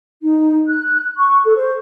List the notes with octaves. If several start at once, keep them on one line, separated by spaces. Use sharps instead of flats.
D#4
F#6
C#6
A4
C5